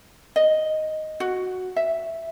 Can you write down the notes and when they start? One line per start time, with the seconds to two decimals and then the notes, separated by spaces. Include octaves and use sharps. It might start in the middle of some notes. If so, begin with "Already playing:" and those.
0.36 D#5
1.20 F#4
1.76 E5